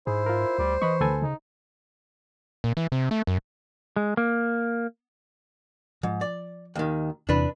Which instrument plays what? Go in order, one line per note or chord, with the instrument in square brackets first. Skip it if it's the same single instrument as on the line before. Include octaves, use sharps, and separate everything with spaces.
[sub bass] G#2 [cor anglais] E4 [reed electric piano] G#4 [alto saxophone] C5
[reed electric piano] F4 A#4
[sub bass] D2 [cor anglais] G3
[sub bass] E3 [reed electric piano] B4 B5 C#6 [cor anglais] D#5
[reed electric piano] D2 A4 G#5 [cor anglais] B4
[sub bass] C#3 [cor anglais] D#4
[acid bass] A#2
E3
C3
A3
F#2
[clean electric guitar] G#3
A#3
[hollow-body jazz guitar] G#2 [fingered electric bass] F3
[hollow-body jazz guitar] D5
D#2 D#3
[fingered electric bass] E2 C3 E3 [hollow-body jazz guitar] D4 B4